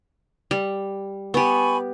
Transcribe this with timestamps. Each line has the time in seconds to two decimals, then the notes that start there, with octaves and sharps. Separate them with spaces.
0.51 G3
1.34 B3 G4 G#5 B5 C#6